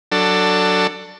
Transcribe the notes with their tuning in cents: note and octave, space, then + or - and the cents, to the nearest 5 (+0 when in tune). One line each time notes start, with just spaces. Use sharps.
F#3 +0 D4 +5 A4 +20